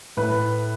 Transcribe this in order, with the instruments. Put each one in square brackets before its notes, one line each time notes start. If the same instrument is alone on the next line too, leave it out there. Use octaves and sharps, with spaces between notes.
[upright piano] A2 B4